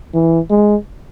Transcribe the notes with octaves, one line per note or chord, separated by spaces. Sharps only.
E3
G#3